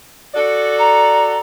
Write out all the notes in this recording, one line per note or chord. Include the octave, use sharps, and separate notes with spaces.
F#4 A4 D5
A#5